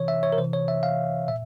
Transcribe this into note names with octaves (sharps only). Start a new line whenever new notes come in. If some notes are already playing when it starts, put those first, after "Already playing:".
Already playing: C3 E3 C#5
E5
C#5
A#4
C3 E3 C5
C#5
E5
F5
A#2 E5